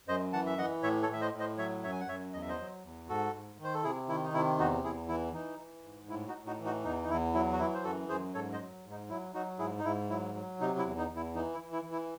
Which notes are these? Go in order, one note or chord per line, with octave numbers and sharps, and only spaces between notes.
F#2 C5 D#5
E3 F#5 A5
E5
E3 D#5 F#5
A2 C#5 E5
A4 C#5
A2 E5
C5 D#5
A2
C5 D#5
F#3 C#5 E5
F#2 C#5 E5
G#5
F#5
F#2 C#5 E5
E2 D#5
E5
C5 D#5
F#3
E2
G#2 F#4 A4
G#2
D#3
C5
A4
C3 E4 G#4
D#3 E4
D#4
C3 E4
E2 D#4 F#4
E2 E4 G#4
E3 E4
E3 D#4
E3
G#2
A2 E4
D#4 F#4
A2
D#4 F#4
E3
D#4 F#4
E2 D#4
D#4
E2 E4
F#3 E4
F#4
E3 E4
C5
F#2 F#4 A4
F#2 G#4 C5
G#2 A4 C#5
C5 D#5
F#3
G#2
D#4
F#3 E4
F#3 D#4 F#4
G#2 E4 G#4
D#4
G#2 E4
F#3 E4
F#3
C3 D#4
E4
E2
D#4
E2
E4
E3 D#4
E4
E3
E4
E3
E4